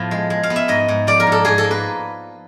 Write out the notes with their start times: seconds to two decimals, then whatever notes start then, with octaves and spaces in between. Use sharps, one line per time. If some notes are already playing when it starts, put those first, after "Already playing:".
Already playing: A2 F3 B3
0.11 G#3
0.30 G#3
0.43 F5
0.50 B3
0.56 E5
0.68 G#2 D#5
0.88 G#2
1.07 F3 D5
1.20 A#4
1.27 G#2
1.32 A4
1.45 G#2 G#4
1.58 A4
1.64 A#3
1.71 B4